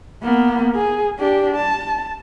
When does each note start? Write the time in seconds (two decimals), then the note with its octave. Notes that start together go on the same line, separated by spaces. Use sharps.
0.23 A#3 B3
0.76 G#4
1.19 D4 G4
1.57 A5